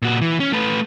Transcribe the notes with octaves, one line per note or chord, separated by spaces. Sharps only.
A#2 F#4
E3
C#4
A3 B4